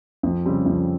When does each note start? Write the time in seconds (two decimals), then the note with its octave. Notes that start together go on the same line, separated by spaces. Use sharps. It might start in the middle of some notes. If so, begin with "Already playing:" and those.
0.23 F2
0.46 C#3 G3 C4
0.66 F2